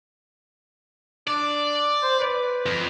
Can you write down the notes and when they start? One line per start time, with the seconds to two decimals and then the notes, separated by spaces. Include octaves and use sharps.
1.28 D4 D5
2.03 C5
2.19 B4
2.66 F2